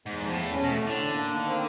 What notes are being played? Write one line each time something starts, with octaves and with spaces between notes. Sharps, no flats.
E2 G#2
F3
A2
E2
C#4
B2 A3
A2 D3
D4
A#3
D#3
C4